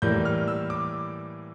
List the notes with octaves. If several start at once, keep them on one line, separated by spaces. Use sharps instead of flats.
A2 E3 G3 A#3 G6
F6
E6
D6